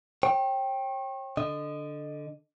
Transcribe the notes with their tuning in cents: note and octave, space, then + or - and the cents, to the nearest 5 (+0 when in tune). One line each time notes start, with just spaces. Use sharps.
C#5 -40 G5 +0
D3 +0 D#5 -20